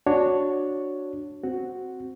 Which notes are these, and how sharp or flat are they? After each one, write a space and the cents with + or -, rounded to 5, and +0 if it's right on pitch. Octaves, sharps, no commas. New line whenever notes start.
D4 +0 F#4 -10 C#5 +0
C4 +0 F#4 +0